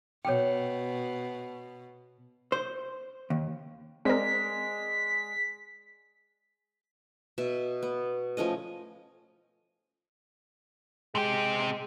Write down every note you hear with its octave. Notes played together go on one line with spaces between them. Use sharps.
B2 C#5 G5
C5
D#2
G#3 C4 A#4 D5 B6
B2 E5
B3
F3 A3 C#4 D#5
C3 G#3 G4